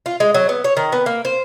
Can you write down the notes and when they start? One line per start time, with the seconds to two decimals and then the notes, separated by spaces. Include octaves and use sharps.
0.06 F4
0.20 G#3
0.34 F#3
0.49 B3
0.64 C#5
0.77 D#3
0.92 B3
1.06 A#3
1.25 C5